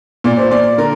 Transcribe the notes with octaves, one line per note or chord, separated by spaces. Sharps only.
A#2 D5
C5
A#2 D5
D3 A#4